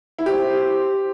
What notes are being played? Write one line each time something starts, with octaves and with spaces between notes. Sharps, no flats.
E4
G4 C5